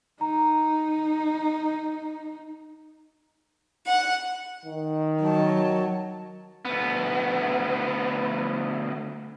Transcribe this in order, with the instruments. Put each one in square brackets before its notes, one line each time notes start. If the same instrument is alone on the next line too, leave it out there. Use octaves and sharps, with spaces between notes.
[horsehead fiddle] D#4 [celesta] A#5
[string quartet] F#5
[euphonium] D#3
[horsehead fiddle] F#3 A5
[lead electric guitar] D2 B3